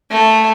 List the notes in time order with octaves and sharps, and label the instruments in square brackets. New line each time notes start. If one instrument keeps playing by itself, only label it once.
[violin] A3